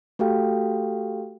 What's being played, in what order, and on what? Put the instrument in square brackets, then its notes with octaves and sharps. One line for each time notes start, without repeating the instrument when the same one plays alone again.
[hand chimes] A3 F#4 G4 A4 F5 G5